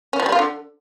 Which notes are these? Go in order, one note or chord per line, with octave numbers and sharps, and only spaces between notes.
C#4
F3
G3
F4
D3